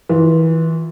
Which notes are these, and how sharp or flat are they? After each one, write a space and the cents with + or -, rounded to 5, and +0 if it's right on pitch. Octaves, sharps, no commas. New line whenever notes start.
E3 -25 F4 +0